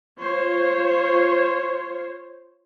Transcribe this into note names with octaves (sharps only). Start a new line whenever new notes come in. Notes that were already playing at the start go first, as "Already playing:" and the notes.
F4 C5 C#5